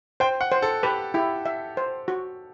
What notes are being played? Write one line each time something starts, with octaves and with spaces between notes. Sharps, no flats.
C5 G5
F#5
C5
A4
G4 B4
E4 G4
E5
C5
F#4